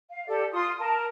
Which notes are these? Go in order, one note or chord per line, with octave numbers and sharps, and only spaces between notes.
F5
G4 A4 D5
F4 C6 D#6
A#4 A5